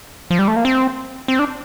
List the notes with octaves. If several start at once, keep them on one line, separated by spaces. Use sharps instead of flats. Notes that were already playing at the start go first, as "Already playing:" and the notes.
F3
G3
A3
A#3
C4
C4
D4